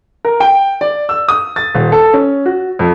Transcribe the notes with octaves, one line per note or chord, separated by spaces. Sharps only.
A#4
G5
D5
E6
D#6
A6
D#1
A4
C#4
F#4
F2